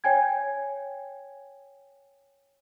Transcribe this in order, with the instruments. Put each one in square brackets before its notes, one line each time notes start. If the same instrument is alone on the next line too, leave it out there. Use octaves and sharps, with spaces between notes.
[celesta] C#5 G5 G#5 G#6